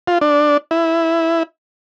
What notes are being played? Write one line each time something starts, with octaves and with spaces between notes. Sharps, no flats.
F4
D4
E4